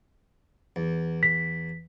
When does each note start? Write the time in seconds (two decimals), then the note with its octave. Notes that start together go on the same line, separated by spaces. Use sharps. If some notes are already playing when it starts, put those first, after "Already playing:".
0.76 E2
1.23 B6